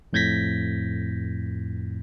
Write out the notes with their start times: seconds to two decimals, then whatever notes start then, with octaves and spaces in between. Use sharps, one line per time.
0.13 F2 A2 G6 G#6 A#6 B6